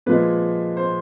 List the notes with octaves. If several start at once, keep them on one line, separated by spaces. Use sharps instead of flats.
A#2 F3 G#3 B4
C5